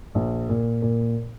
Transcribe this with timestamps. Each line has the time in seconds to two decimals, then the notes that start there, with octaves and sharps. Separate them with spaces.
0.15 A#1
0.49 A#2
0.82 A#2